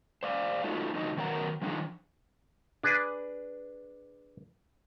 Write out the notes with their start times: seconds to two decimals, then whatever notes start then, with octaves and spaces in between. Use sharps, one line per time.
0.23 C5 D5 F5
0.64 G#3 A3 D#4 F4 F#4 A4
0.95 D3 F3 G#3 D#4 F#4 D#5
1.17 B2 D#3 F#3 A#4 F#5 A#5
1.62 D#3 F3 D4 D#4 G#4
2.83 D4 G#4 B4